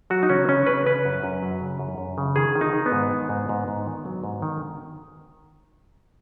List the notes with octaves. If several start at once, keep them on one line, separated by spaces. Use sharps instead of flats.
F#3 F#4
D#4
C#3 C#4
C#3 C#4
C#3 B4
C#3 B4
F#2
F#2
F#3
C#3
F#2
F#2
C#3
D#3 G#4
D#3
D#4
D#3
B3
G#2
D#3
G#2
G#2
G#2
D#3
F#3
G#2
D#3